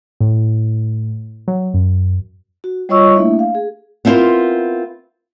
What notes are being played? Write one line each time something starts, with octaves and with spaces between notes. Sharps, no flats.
A2
F#3
F#2
F#4
G3 F4 C#5 D#5 C#6 E6
A3 A#3 D4 E4 E5
F5
G#4
B3 C4 D4 E4 F4 A#4